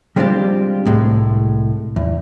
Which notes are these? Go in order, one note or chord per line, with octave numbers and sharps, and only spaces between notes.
G3 G#3 C4 D4 F4 G4
C2 A2 G#3
E2